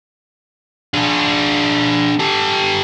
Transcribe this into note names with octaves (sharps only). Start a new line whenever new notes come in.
D4 G#4
G4 A4